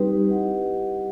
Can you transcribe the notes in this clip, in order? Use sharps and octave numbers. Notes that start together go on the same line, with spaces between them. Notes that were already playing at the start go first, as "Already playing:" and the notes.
Already playing: G3 C4 D#4 G4 B4
E4 G4 D#5 F#5